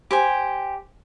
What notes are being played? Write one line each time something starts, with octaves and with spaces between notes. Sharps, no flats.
G4 C5 G#5